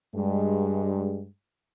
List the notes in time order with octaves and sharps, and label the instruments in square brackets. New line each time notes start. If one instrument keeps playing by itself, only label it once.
[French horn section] G2 G#3